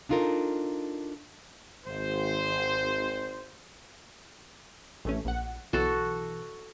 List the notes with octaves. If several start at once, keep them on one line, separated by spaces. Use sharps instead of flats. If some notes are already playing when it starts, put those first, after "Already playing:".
D4 D#4 F4 A4 A#4
G#1 C5
A1 A3 C#4
A#1 F#5
B1 E3 F#4 A4